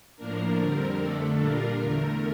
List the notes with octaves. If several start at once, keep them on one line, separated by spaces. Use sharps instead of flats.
A2 F3 A#3 D4 A#4
F2 D3 G3 C4
F2 D3 A3 D4 A4
A#2 G3 D4 F4 A#4
E2 D3 A3